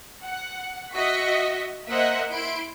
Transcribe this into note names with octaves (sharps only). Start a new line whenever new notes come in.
F#5
F#4 D#5 E5 B6 C#7
A#3 C5 D#5 E5 F#5
E4 C6 D7